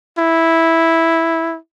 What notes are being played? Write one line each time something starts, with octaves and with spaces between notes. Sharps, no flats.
E4